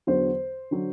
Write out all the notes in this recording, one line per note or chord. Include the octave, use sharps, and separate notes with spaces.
E2 D3 F#3 C5
D3 F#3